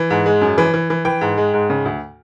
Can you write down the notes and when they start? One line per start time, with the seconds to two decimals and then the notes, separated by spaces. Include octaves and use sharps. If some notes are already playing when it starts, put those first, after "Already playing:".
Already playing: E3
0.10 G#2
0.26 G#3
0.41 F#2
0.58 E3
0.74 E3
0.90 E3
1.05 E3 G5
1.21 G#2
1.38 G#3
1.54 G#2
1.70 C#3
1.85 D2